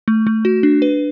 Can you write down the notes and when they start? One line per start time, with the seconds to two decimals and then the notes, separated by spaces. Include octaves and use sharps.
0.08 A3
0.27 A3
0.45 F#4
0.63 D4
0.82 B4